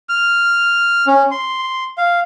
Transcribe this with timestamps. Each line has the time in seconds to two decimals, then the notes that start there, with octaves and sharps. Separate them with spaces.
0.09 F6
1.07 C#4
1.31 C6
1.98 F5